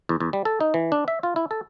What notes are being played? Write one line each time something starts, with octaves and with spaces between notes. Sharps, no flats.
E2
E2
G3
A4
D#4
E3
D4
E5
F4
E4
A4